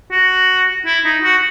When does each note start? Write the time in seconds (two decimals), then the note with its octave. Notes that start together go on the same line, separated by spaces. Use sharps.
0.11 F#4
0.86 E4
1.05 D#4
1.23 F#4